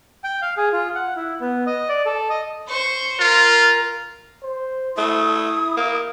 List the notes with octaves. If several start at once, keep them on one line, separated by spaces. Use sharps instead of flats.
G5
F5
G#4
F4
F#5
E4
B3
D#5
D5
A4
D#5
C5 C#6
F4 A#4
C5
A3 E4 D#6
A#3